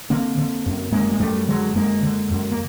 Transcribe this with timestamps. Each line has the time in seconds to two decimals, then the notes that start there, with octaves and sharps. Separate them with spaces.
0.10 D3 A#3 C4
0.37 D3
0.66 F#2
0.92 F#2 G#3 A#3
1.11 G#3
1.20 F#2 G3 A3
1.48 D3 F#3 G#3
1.75 F#2 G#3 A#3
2.03 D3
2.31 F#2
2.51 A#3